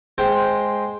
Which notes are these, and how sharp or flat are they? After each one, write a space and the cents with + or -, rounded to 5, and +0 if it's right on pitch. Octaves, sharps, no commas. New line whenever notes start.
G#3 +0 C5 +0 G5 +0